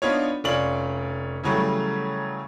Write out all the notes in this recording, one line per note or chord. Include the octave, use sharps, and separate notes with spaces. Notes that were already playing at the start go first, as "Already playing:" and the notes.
B3 D4 D#4 F4 C#5
F1 C#4 F4 D5 F#7
C#3 E3 F#3 G3 A3